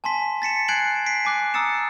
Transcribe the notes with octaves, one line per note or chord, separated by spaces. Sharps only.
G#5 A5 C6 B6
A6 B6 C#7 E7
G#5 F#6 G#6 C7 D7 F#7
B6 C7 D7
G#5 D6 F#6
A#5 D#6 E6 A6 C#7 E7